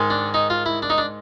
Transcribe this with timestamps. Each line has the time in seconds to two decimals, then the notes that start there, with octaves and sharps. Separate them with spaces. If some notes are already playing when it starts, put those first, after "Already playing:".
Already playing: G#2 D#3 G#3
0.10 D4
0.34 D#4
0.50 F4
0.66 E4
0.82 D4
0.90 D#4
0.98 D4